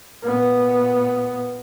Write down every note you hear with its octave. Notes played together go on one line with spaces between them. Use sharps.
A#2 B3